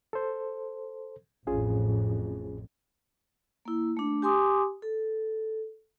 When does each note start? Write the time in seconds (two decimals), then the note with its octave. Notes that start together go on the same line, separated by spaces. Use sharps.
0.13 A4 C5
1.47 A1 F2 A2 C#4 F4 G#4
3.65 A#3 E4
3.97 A3 D4
4.22 G4 G#5 C6 D6 D#6
4.82 A4